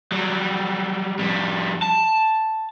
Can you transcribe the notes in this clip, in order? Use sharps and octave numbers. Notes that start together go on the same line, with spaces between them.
F#3 G3
F2 G3
A5